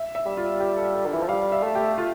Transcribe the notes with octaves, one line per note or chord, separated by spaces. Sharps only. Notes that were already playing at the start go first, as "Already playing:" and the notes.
Already playing: E5
E5
G3
F4
G4
A4
A4
D3
E3 E5
F3
G3 F5
E5
A3
G4
F4